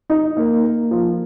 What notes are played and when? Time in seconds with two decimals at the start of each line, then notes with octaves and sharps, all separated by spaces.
0.10 D#4
0.37 A#3
0.64 A#3
0.91 F3